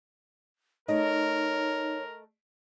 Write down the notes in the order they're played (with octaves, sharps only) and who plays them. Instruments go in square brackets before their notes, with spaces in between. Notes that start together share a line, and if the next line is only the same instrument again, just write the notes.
[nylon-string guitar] A3 D#5 [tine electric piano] D#4 [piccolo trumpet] A#4 [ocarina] C#5